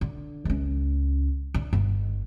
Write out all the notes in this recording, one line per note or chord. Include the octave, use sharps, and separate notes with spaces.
D3
C#2 C#4
D3
G1